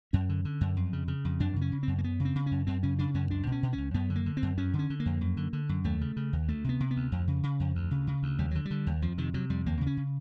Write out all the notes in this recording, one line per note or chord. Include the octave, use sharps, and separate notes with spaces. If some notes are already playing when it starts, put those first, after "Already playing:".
F#2 C#4
D3
D3
F#2
F2
C#3
C#3
F2
F#2 D4
C#3
C#4
C#3
F#2 C4
A#3
F#2 B3
C#3
C4
C#3
F#2 C#4
F#2 C4
C#3 C#4
C#3 D4
F#2 C#4
C#2 D4
B2
C#4
B2
C#4
C#2
F#2 B3
D3
A#3
D3
C4
F#2
F2 C#4
D3
C#4
D3
A#3
F2
F#2
D3
D3
F#2
D#2 A3
C#3
C#3
D#2
D2 A3
C3 B3
C3
B3
D2
F2
C#3
C#3
F2
D2
C#3
C#3
D2
D#2 G3
D3 F#3
G3
D3
D#2
F2 F3
C3 D#3
C3 F#3
F2 G3
D#2 A#3
C#3
C#4
C#3